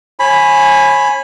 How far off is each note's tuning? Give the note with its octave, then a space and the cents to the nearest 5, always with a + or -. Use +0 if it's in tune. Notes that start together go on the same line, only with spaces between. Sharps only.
C#5 -35 G#5 +5 B5 +0